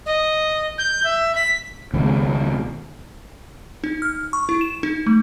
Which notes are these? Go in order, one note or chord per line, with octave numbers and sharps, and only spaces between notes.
D#5
G6
E5
B6
C#2 B2 D#3
D#4
F6
C#6
E4
E7
D#4
A3